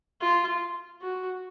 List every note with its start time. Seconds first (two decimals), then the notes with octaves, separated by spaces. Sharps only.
0.21 F4
1.01 F#4